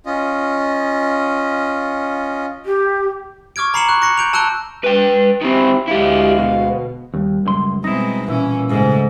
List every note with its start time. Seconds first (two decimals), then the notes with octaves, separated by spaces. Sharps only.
0.06 C#4 F4 D#5
2.65 G4
3.56 C#6 D6 F6 G#6 D7
3.74 A#5 B5 C7 C#7 E7 F#7
3.89 C#6 F#6
4.02 C#6 A#6 C#7
4.17 G6 D7 F7
4.33 A5 E6 F#6 D7 G7
4.84 B4 G5
5.42 D#3 C4 E4 G4
5.88 D2 G#3 E4 G4 F5
6.38 B2
7.14 D#2 G3
7.45 C#2 F#2 C6
7.84 B2 G#3 C4 D#4 E4 A#6
8.28 A#2 E3 C#4 E4
8.70 G#2 C#3 A3 A4